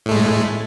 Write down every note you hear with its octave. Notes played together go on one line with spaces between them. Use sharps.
A2 G#3 A3